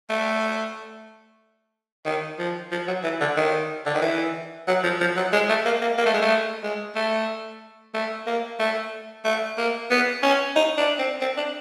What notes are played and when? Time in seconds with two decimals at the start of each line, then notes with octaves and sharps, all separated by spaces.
0.10 A3
2.06 D#3
2.39 F3
2.72 F3
2.87 F#3
3.04 E3
3.21 D3
3.37 D#3
3.86 D3
3.94 D#3
4.02 E3
4.67 F#3
4.84 F3
5.00 F3
5.16 F#3
5.33 G#3
5.49 A3
5.65 A#3
5.81 A#3
5.98 A#3
6.06 A3
6.14 G#3
6.22 A3
6.63 G#3
6.96 A3
7.94 A3
8.27 A#3
8.60 A3
9.25 A3
9.58 A#3
9.91 B3
10.23 C#4
10.56 D#4
10.78 D4
10.99 C4
11.21 C4
11.37 D4